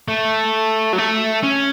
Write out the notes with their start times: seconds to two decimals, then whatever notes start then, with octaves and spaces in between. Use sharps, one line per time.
0.08 A3
0.93 F#3
0.98 A3
1.43 C#4